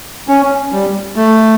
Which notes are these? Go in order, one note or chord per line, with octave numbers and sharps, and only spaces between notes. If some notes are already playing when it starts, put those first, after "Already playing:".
C#4
G3
A3